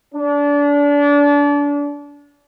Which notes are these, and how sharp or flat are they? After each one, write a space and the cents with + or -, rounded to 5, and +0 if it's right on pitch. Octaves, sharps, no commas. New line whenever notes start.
D4 -30